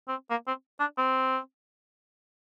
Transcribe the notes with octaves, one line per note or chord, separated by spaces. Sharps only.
C4
A#3
C4
D4
C4